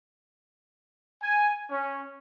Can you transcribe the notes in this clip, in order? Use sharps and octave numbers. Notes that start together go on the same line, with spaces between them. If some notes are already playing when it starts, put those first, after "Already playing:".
G#5
C#4